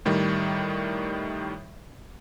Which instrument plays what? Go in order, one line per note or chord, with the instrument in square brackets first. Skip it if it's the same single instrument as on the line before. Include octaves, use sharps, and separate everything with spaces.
[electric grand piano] A2 D#3 G3